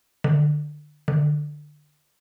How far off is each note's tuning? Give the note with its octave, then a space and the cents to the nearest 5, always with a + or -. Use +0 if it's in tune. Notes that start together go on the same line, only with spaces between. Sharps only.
D3 +25
D3 +20